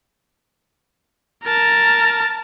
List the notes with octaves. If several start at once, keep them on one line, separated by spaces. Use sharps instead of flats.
A#4 A5